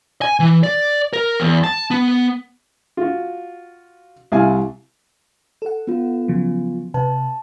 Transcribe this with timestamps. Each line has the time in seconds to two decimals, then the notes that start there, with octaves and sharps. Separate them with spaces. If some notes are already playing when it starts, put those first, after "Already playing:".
0.22 G#5
0.40 E3
0.63 D5
1.13 A#4
1.40 E2
1.64 A5
1.91 B3
2.97 F4 F#4
4.32 C2 C3 E4 F5 G#5
5.62 A4 F#5
5.87 B3 F4
6.28 C#3 F3 F#3
6.94 C3 B4 A5